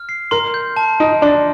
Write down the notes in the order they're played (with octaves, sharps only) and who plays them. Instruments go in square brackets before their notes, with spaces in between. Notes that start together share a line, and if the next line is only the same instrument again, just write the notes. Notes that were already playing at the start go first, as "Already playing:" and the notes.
Already playing: [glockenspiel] F6
C7
[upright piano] A#4 [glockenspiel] C6
[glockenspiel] G6
A5
[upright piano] D#4 [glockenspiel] D7
[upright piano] D4 [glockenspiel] C6